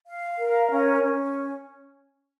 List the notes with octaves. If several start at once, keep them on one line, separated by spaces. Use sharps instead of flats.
F5
A#4
C#4
C#4